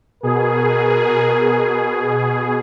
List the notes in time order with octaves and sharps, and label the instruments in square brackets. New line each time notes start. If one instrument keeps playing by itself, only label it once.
[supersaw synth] B2 G#4 [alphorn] A#4